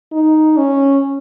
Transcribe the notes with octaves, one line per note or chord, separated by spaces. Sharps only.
D#4
C#4